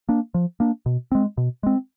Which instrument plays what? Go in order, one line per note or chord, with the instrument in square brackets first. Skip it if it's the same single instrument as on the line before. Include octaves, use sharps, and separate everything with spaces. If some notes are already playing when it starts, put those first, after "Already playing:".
[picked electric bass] A#3 D4
F3
A#3 D4
B2
G#3 C4
B2
G#3 C4